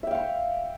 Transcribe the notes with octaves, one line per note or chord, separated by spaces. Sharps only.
E5 F5 G5 C#6